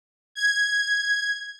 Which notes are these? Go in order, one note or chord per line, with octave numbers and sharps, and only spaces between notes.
G#6